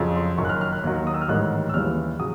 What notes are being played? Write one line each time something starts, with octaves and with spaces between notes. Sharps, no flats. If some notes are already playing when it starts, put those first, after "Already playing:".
Already playing: F2 C#3 F#3
C6
F#1 F#2 D#3 C#6
F#6
F6
F6
F#6
D#2 D#3 F#3
D#6
E6
F6
A1 G#2 D#3 G3 F#6
E6
D#2 C#3 E3 G3 F6
C#3 F#3 D#6